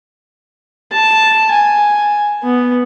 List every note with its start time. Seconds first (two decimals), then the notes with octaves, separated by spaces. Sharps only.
0.92 A5
1.51 G#5
2.43 B3